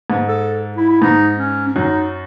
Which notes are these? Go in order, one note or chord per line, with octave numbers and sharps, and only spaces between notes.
G#2
A4
E4
E4
G#2 D#4
C#4
C#4
F#2 D#4